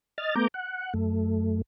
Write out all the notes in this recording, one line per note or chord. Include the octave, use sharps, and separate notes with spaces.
D#5 F6 A6
A3 B3 A#5 D6 G6
F#5
F#2 A3